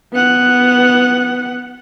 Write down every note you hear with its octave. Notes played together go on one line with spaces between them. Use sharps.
B3 F#5